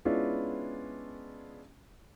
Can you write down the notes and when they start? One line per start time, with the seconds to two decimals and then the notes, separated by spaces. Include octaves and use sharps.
0.05 G#3 B3 C#4 D4 E4 F4